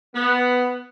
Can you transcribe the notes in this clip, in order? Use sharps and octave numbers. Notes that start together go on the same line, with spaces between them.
B3